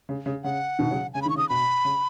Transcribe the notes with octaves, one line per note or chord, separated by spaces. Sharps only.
C#3
C#3
C#3 F#5
B2 D#3
C#3 F#3
C#3 G#5
B5
D#3 C#6
C#3 D#6
B2 B5
C#3